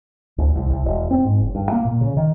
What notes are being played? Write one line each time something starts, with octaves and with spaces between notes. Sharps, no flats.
D2
C2
C2
E1
C4
G#2
F#1
G2
A#3
A#2
C#3
D#3